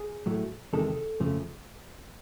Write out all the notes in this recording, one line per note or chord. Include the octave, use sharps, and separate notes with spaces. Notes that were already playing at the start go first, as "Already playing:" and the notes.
Already playing: G#4
A2 F#3 A3
E2 C3 D#3 G#3 A4
F2 C#3 F3 A3